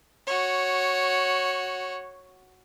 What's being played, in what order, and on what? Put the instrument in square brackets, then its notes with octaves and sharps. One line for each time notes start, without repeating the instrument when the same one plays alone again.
[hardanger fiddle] F#4 C#5